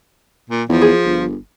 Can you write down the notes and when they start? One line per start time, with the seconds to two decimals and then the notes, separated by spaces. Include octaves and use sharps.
0.50 A#2
0.69 E2 F3
0.81 G#4
1.05 G1